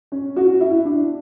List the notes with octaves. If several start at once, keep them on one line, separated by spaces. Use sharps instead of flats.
C#4
F#4
E4
D4